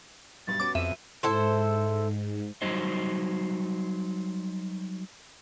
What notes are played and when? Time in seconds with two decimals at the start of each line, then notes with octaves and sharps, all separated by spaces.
0.47 B1 G2 A6
0.60 B3 C#4 F#4 D6
0.75 F2 E5 D#7
1.23 G#2 E4 A4 C5
2.62 F#3 G3 D#4 C5 D#5